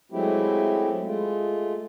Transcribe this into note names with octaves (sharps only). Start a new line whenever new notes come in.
F#3 G#3 A3 C4 E4 G4
G#3 A3 F4